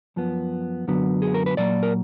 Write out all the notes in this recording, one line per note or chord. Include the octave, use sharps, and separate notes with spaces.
F#2 F3 B3
F#2 D3 F#3 B3
G#4
A#4
B4
A#2 F#3 A#3 D5
A#4